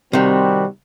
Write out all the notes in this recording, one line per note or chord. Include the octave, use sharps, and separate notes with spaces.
C3 D#3 G3 C4 F#4